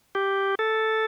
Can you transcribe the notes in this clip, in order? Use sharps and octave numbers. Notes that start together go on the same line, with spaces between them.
G4
A4